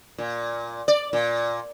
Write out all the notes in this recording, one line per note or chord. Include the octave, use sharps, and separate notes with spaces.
A#2
D5
A#2